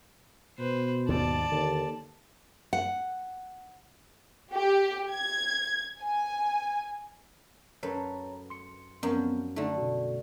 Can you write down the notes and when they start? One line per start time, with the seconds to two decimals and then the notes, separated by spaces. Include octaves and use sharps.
0.59 B2 B4 C5
1.08 D#2 G#2 D5 A5
1.52 D#2 D3
2.73 F#5
4.54 G4
5.12 G#6
6.01 G#5
7.83 F#2 A4 B4 C#5 A#5
8.50 C6 C#7
9.03 F#2 F3 B3 C4
9.56 D3 A3 D#4
9.77 B2 F#4